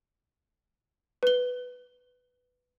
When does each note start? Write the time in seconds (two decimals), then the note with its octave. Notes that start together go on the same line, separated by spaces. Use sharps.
1.23 B4 G7